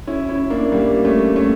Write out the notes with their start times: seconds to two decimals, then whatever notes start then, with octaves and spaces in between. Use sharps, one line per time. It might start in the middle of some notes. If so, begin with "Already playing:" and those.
0.07 C#4 E4
0.29 C#4 E4
0.50 A#3 D4
0.72 G3 A#3
1.04 A3 C#4
1.36 A3 C#4